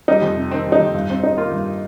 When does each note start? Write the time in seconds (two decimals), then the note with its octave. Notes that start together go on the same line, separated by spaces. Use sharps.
0.08 G3 D#4
0.22 F2
0.36 C3
0.51 D#3 C4
0.65 G3
0.72 D#4
0.80 F2
0.94 G2
1.09 G2 C4
1.23 G3 D#4
1.37 A#3 F4
1.51 G2